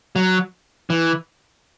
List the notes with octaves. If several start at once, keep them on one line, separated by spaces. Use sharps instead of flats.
F#3
E3